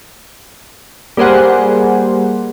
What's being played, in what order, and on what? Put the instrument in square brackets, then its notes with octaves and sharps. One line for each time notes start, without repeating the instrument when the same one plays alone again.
[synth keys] G3 A#3 G#4 C5 F#5